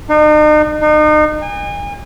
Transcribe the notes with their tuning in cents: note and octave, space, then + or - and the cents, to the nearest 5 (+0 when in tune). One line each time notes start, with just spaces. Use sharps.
D#4 -40
D#4 -35
G#5 -40